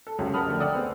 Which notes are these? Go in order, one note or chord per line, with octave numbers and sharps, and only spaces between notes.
A4
C#2 F#2 C3 F#3 C#4
A#4 F#5 A5 B5 D#6 F6
F2 D3 A3
D5 F#5 G5 D#6 E6
B3 C4 G#4